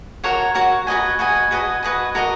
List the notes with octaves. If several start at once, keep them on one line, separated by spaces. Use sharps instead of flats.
F#4 A#4 C#5 F#5
F#4 A#4 C#5 F#5
F#4 B4 D#5 G#5
F#4 B4 D#5 G#5
F#4 B4 D#5 G#5
F#4 B4 D#5 G#5
F#4 A#4 D#5